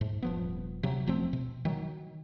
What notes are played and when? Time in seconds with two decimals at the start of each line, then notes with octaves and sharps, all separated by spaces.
0.01 G#2
0.22 D#1 F3 B3
0.83 C3 F#3
1.07 D#1 F3 A3 C4
1.33 B2
1.65 D#3 F#3